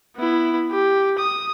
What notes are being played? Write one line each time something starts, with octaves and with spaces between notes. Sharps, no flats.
B3 E4
G4
D#6